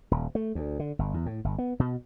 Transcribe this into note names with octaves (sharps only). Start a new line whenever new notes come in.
D#1
A3
D2
D3
G1
E2
A2
G1
B3
B2